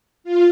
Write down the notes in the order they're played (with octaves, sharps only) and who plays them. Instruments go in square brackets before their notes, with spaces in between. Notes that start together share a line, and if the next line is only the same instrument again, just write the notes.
[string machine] F4